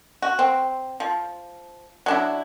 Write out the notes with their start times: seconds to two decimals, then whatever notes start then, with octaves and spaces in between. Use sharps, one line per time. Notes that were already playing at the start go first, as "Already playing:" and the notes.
0.22 F#4
0.39 C4
1.00 F3
2.06 F#3 D4 E4